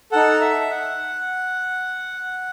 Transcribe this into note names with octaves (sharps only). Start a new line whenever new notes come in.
D#4 A4 F#5
E5
F#5